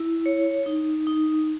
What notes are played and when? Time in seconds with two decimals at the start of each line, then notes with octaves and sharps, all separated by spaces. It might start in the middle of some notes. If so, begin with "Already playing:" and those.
Already playing: E4
0.26 C#5
0.66 D#4
1.07 D#4